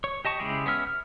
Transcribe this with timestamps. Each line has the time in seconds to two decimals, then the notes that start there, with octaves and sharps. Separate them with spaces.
0.04 C#5
0.25 G4 D#5 A5 C#6
0.39 C#3 G#3 E4 G4 G#4
0.66 B3 C#4 E5 F6
0.87 F6